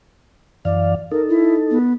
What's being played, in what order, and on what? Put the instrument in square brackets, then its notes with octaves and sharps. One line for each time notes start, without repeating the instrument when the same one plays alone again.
[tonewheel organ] F#2 E3 F5 [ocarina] D5
[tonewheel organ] D#4 A4 [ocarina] A#4
[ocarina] E4
B3